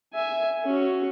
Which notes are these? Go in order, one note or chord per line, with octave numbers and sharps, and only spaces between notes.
E5 G#5
C#4 F#4